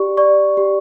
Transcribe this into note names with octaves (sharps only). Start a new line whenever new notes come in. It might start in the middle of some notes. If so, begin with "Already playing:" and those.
Already playing: G4 D5 C#6
D5 C#6
G4